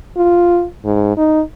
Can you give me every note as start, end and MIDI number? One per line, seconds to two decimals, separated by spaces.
0.17 0.66 65
0.85 1.15 44
1.17 1.41 63